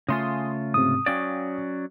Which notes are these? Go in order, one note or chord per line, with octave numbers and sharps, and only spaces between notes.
C#3 A3 F4 G#5 C6 D#6
G#2 C3 D#6
F#3 C#4 D5 F5 G5